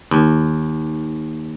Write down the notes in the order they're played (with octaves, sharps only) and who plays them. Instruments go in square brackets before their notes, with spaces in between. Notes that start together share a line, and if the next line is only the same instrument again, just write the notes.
[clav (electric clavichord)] D#2